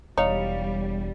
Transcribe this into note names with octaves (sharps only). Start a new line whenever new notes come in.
E1 G3 D#4 C#5 F5